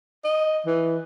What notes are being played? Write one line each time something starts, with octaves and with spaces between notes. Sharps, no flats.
D#5
E3